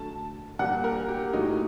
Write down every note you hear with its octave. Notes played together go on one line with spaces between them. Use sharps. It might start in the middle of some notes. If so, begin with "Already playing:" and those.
Already playing: D3 F#3 A3 A5
A#2 G3 A#3 F#5
A#4
G4
A2 F#3 A#3 D#4